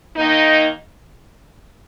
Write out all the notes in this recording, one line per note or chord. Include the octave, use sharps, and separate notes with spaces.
D#3 A#3 D#4